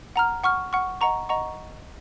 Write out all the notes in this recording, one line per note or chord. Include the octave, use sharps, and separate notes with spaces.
F#5 A#5 F6
F#5 C#6 F6
F#5 C#6 F6
D#5 F#5 A#5 C#6
D#5 F#5 A#5 C#6